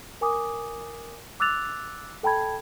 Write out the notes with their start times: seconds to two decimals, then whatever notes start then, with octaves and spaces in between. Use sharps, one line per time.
0.21 A#4 G#5 D6 D#6
1.40 D6 E6 F#6 A6 F7
2.23 A4 G5 A5 B5 G#6